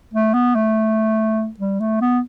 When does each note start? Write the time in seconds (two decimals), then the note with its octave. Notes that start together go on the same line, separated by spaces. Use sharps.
0.13 A3
0.34 B3
0.55 A3
1.60 G3
1.81 A3
2.01 B3